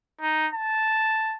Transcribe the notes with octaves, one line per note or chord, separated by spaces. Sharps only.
D#4
A5